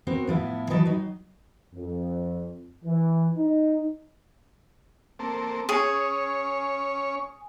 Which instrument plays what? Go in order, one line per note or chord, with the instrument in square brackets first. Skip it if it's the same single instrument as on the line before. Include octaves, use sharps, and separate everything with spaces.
[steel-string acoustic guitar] B3 C4 F#4 A#4
A2 F3 B3 E4
D#3 E3 F#3 B4 D#5 A5
F#3 D#4
[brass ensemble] F2
E3
D#4
[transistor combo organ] A#3 C4 A4
[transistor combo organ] C#4 C#5 [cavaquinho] G#4